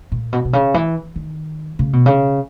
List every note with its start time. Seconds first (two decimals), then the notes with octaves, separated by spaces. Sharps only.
0.12 A#2
0.33 B2
0.45 B2
0.53 C#3
0.74 E3
1.16 D#3
1.79 C#3
1.93 B2
2.06 C#3